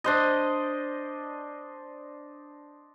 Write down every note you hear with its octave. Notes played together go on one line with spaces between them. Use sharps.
D4 C5 D#5